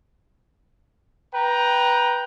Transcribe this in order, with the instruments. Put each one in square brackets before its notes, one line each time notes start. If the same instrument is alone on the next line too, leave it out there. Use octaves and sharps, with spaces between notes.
[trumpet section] B4 G5 A#5